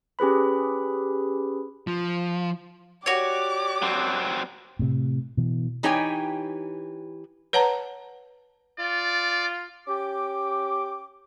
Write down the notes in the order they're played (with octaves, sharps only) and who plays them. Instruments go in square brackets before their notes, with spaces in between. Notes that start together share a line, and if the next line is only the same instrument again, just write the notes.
[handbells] C#4 G4 G#4 B4 B5
[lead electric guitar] F3
[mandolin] F#4 C#5 [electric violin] G4 D5 [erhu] D6
[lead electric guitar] F#3 C4
[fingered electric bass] A2 C3
B2 E3
[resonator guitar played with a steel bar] E3 D#4 G4 C#5 G5 G#5
[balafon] B4 C#5 F#5 A5 A#5
[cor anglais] F4 [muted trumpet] D5
[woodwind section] C#4 G4 G5 D6